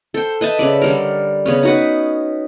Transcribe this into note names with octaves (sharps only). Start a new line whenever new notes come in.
A4 C5 G5
B4 D#5 E5 A5
C#3 B4 D5
D3 G3 A#4
C#3 B3 C#4
D#4 F#4 B4